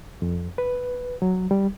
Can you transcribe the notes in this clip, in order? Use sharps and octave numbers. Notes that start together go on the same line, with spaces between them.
F2
B4
F#3
G3